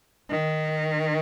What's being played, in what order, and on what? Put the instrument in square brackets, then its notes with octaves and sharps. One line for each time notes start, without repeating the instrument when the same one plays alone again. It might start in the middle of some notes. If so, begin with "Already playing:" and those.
[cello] D#3